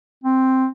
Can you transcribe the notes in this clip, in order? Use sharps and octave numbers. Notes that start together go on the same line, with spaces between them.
C4